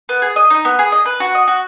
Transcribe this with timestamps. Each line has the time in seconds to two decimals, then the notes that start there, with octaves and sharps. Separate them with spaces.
0.09 B3
0.22 G#4
0.36 D#5
0.50 D#4
0.65 B3
0.79 G#4
0.92 D#5
1.06 B4
1.20 F#4
1.35 D#5
1.47 F#4